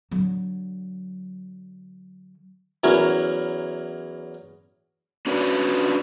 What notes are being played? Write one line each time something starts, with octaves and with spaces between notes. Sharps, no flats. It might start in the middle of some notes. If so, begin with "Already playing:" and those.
D3 F#3
E2 F#3 C#4 E4 A#4
C#4 D4 F#4 B4 C#5 D5